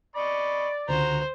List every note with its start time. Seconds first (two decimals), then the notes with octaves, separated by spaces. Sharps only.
0.16 D5 D#5 B5 C#6
0.89 C#2 D3 F#4 C5 A#5